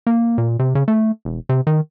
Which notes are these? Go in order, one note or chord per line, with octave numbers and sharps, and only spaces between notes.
A#3
A#2
C3
C#3
A3
E1
C3
D#3